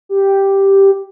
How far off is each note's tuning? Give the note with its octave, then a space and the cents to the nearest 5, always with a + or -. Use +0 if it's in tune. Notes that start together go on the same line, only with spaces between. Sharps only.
G4 +0